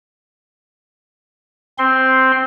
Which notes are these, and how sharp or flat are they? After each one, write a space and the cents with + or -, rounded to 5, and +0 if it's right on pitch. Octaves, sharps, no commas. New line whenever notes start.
C4 +0 C6 +0